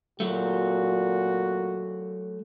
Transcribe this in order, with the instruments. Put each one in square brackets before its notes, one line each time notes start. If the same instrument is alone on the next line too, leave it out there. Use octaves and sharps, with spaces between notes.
[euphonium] A#2 [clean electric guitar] F#3 A3 [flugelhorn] F#4